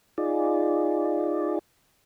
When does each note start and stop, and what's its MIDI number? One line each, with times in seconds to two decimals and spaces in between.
0.18 1.59 63
0.18 1.59 65
0.18 1.59 68
0.18 1.59 74